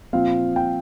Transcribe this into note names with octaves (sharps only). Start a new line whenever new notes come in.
A#2 F3 C4 F5
G5